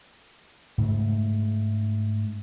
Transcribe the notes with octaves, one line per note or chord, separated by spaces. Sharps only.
G#2 C#3 A3